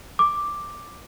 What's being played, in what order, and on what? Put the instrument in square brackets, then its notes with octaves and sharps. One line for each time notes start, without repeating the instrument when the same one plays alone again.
[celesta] D6